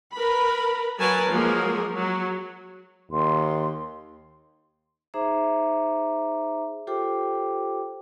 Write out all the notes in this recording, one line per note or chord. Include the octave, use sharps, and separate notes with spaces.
A#4 B4 B5
F#3 A#4 B4 G#5 A5
F3 F#3 G#3 A#3 G#4 A#4
F#3
D#2 C6
D#4 G#4 C5 E5 A#5 D6
F4 G4 A4 C5 G5 D6